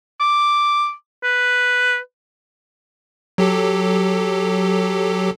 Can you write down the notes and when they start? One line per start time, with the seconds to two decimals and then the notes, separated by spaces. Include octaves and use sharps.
0.21 D6
1.23 B4
3.38 F#3 G4 A4